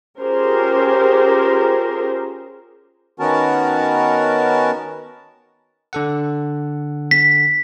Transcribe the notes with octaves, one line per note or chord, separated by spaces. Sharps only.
C#4 F4 G4 G#4 A#4 C5
D#3 B3 C#4 F#4 A#4 A5
D3 A4 F#5
B6